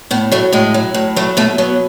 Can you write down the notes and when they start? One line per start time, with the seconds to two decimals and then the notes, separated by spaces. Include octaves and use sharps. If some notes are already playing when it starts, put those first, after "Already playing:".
0.11 A2 B3
0.32 F#3 A3
0.52 A2 G#3
0.74 F#3
0.94 A2
1.16 F#3 A3
1.37 B2 A3
1.58 F#3 B3